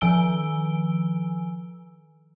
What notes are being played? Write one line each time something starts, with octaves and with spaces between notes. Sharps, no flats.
D#3 F3 G#5 E6 D7 G7